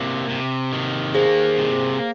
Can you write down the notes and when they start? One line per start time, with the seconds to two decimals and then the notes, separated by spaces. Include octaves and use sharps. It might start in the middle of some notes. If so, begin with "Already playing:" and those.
Already playing: C3 A#3
0.29 C3
0.73 D#3
1.15 A#3 G#4 C5
1.58 C3